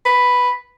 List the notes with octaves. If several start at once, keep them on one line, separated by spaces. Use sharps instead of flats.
B4